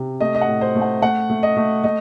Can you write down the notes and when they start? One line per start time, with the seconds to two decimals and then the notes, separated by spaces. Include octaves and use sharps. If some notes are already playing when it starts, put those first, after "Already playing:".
Already playing: C3
0.21 A3 D#5
0.35 D#5
0.41 F#5
0.48 A2
0.61 C5
0.75 A3
0.82 F#5
1.02 A3 F#5
1.30 A3
1.43 D#5
1.57 A3
1.84 A3 D#5